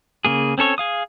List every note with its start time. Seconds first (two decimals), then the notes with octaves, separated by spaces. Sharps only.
0.25 C#3 A#3 G#4
0.58 C4 C#4 A4 C#5
0.78 G#4 F5 D#6